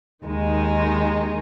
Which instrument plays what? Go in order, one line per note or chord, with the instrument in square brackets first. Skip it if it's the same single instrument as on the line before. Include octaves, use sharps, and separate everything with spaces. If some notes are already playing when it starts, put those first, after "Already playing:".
[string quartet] D#2 D#3 G#3 D#4